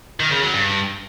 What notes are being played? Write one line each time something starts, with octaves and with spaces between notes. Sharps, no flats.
D#3
C#3
F#3
G2